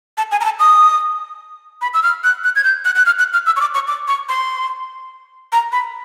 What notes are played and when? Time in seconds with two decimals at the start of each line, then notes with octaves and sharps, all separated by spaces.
0.18 A5
0.31 G#5
0.41 A#5
0.45 A5
0.59 D#6
1.82 B5
1.94 E6
2.03 F6
2.24 F#6
2.44 F#6
2.56 G#6
2.64 G6
2.85 F#6
2.95 F#6
3.06 F6
3.19 F#6
3.33 F6
3.46 E6
3.56 C#6
3.61 D6
3.74 C#6
3.88 D6
4.08 C#6
4.29 C6
5.52 A#5
5.72 B5